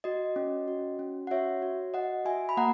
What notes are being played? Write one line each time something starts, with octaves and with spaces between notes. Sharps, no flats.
F#4 D#5
C#4
F#4
C#4
F#5
F#4 C#5 E5
F#4
F#4 D#5 F#5
F#4 E5 G#5
B5
A#3 F#5 A#5